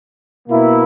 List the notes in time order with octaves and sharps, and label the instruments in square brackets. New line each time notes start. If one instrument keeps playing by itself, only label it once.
[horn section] B2 A#3 E4